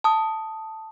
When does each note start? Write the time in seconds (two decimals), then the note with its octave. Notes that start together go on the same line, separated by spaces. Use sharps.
0.04 A5 D#6